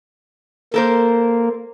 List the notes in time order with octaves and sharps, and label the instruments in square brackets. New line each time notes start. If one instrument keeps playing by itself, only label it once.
[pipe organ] A#3 [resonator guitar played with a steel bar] A4 A#4 C5